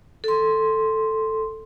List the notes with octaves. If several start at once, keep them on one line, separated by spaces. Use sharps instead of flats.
A4 C6